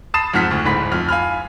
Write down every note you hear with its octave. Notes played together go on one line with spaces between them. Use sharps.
A5 B5 D#6 A6 C7 E7
F2 G#2 F#5 F6 B6
D2
D1 G#2 B5 B6
F2 F6
F5 G#5 B5 F6